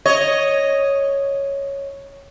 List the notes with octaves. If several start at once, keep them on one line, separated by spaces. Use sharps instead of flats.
C#5 D#5